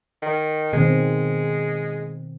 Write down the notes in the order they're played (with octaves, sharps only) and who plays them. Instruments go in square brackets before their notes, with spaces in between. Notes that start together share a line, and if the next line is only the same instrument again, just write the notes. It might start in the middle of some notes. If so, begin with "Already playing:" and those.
[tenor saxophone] D#3
[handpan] B2 D#3 C4 [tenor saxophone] G#3